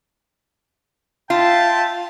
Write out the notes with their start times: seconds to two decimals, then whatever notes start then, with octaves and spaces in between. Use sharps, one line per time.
1.30 F4 E5 G5 A5